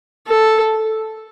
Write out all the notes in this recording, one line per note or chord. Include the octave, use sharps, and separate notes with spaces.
A4